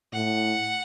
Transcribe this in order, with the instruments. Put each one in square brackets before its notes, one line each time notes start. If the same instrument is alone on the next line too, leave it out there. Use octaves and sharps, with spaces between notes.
[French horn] A2 [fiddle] F#5